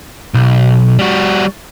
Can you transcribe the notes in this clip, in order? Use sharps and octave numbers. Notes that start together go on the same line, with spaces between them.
B1
G3 F#4